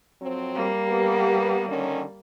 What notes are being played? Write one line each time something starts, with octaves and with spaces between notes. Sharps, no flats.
F2 F#3 C4
G3 A#3
B3 G4
D3 D#3 C#4